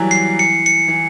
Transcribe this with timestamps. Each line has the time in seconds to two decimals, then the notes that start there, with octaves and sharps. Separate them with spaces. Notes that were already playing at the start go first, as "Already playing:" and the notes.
Already playing: E3 F#3 G3
0.11 C7
0.39 C#7
0.66 C#7
0.88 E3